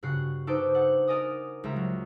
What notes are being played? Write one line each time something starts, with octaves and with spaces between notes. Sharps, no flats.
G2 C#3 F#4 F#6 C7
D#4 A4 B4 C5 G5 D6
A4 F#5
A#4 D5 D#5 G#5 D#6
C#2 G3 E5 A#5
F#3